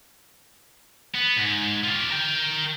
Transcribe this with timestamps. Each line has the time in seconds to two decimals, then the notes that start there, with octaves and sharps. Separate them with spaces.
1.14 B3
1.36 G#2
1.84 F4 G4
2.10 A#4 G5